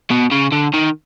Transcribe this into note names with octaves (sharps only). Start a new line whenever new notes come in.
B2
C#3
D3
D#3